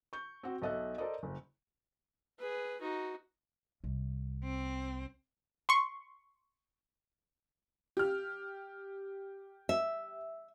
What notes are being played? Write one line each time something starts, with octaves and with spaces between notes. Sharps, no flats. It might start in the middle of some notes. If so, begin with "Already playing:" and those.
C#6 G6
C4 F#4
B1 A4 D#5 E5 F#6
A4 A#4 C5 D5 D#5
F#1
G#4 B4
D#4 F#4
C2
C4
C6 C#6
G4 F6
E5